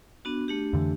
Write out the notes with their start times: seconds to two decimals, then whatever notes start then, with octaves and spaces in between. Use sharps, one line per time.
0.25 B3 D4 F#4
0.48 A3 D4 G4
0.73 F2 D3 E3